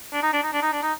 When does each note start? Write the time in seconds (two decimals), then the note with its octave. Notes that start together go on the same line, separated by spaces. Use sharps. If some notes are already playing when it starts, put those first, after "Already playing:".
0.13 D4
0.23 D#4
0.33 D4
0.43 D#4
0.53 D4
0.62 D#4
0.72 D4
0.82 D#4